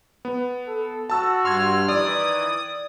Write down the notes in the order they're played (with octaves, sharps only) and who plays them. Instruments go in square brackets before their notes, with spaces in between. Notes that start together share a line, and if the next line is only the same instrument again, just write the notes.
[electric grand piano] B3
[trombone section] A4
[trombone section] F#4 [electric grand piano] A5 E6
[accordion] G2 F6 [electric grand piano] C6 E6 G#6
[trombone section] D#3 E3 [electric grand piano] D5 [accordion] D#6